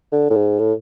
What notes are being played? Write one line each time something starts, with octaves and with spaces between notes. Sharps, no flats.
D3
A2
G#2
A2